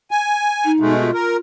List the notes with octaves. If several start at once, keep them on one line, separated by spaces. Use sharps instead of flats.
G#5
D#4
B2 G#3 A3
F4
A#4